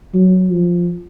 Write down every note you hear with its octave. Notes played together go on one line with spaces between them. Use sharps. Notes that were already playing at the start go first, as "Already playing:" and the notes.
F#3
F3